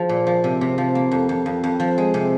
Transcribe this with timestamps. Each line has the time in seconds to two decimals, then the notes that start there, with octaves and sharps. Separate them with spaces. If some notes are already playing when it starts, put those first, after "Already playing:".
Already playing: F3 G#4
0.09 A#2
0.27 F3
0.44 C3
0.61 C3
0.78 F3
0.95 A#3
1.11 F2
1.29 F2
1.46 F2
1.64 F2
1.80 F3
1.98 G#3
2.14 C3